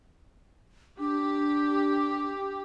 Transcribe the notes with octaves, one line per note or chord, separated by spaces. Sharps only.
D4 G4